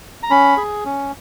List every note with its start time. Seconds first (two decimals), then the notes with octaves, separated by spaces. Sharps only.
0.23 A#5
0.30 C#4 B5
0.57 G#4
0.85 C#4